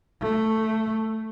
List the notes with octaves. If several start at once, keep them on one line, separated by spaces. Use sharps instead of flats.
A3